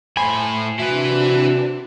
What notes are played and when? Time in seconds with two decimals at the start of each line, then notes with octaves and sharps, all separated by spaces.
0.17 A2 C5 G#5 B5
0.79 C3 D4 E4 F#4 B4